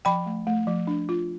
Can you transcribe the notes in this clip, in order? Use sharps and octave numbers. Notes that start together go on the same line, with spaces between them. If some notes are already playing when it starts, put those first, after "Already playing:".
F3 G5 B5
A3
A3
F3
D4
F4